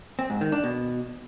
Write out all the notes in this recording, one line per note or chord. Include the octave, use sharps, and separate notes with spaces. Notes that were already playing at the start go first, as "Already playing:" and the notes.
C4
G#2
D#3
D4
B2